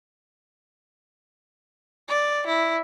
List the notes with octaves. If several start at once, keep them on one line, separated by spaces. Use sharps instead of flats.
D5
E4